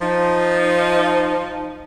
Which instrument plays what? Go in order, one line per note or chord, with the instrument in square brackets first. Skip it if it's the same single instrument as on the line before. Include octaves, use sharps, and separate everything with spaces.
[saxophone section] F3 D#4